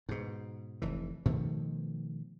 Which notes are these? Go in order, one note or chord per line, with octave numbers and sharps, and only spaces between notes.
G#2 B2
F1 E3
B2 D#3 F3 A3